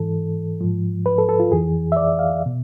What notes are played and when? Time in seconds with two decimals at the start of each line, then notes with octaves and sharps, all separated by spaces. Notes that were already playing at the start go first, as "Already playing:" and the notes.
Already playing: G#2 E3 A4
0.61 G#2 F3
1.06 B4
1.18 A4
1.29 A4
1.40 F4
1.51 F2 E3 G#4
1.92 E5
1.96 D5
2.19 F5
2.46 B2